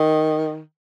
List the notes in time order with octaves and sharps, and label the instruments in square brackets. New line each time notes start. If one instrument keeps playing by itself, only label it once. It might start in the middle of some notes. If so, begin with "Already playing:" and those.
Already playing: [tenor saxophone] D#3